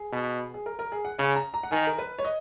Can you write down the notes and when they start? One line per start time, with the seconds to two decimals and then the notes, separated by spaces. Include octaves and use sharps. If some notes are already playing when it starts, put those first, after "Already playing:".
Already playing: G#4
0.12 B2
0.54 G#4
0.66 A#4
0.79 A#4
0.92 G#4
1.05 F#5
1.18 C#3 G#5
1.36 A#5
1.54 A#5
1.63 F#5
1.71 D#3 G#5
1.87 A#4
1.99 B4
2.18 C#5
2.25 D#5